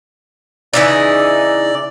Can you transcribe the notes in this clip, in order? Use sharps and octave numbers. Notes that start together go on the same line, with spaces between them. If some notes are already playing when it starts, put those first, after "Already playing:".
C#3 E3 D#4 D5